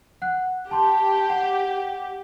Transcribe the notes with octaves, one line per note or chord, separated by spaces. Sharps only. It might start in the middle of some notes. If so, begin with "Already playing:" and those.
F#5 F#6
G4 A5 C6
F#5